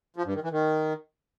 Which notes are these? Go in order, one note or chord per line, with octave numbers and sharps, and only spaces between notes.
F3
G2
D#3
E3
D#3